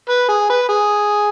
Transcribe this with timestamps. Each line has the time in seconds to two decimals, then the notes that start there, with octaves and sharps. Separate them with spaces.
0.09 B4
0.29 G#4
0.50 B4
0.69 G#4